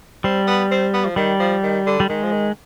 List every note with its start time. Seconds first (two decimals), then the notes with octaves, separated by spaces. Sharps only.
0.24 G3 C4
0.47 B3
0.71 C4
0.93 B3
1.05 F3
1.16 D#3 G3
1.40 F3
1.63 D#3
1.86 D3
2.00 G3
2.09 D#3 G#3
2.23 F3
2.32 D#3